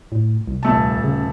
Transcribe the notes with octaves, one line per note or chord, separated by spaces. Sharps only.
A2
C2
D#1 A3 A5
C#3